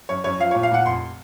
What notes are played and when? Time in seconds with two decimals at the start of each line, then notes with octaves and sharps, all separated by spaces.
0.09 F#2 C#5
0.24 F#2 C#5
0.39 F3 F5
0.51 A#2 C#5
0.63 F5
0.71 A#2 F#5
0.86 F1 C6